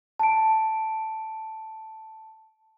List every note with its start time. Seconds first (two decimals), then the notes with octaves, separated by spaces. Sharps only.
0.19 A5 D7